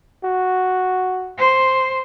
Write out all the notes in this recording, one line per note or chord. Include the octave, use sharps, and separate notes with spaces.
F#4
C5